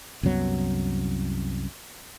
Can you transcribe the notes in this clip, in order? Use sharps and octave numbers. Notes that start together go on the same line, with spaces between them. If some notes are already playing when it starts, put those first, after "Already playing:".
C2 F#2 F#3 B3